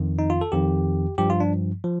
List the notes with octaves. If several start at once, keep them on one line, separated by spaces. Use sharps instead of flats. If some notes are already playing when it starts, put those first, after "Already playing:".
Already playing: F2 D#3
D#4
F4
A4
F2 D#3 G4
G2 F3 G4
F4
D4
F3